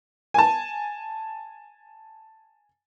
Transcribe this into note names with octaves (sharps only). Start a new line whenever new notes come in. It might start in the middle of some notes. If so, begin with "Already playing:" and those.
G#5 A5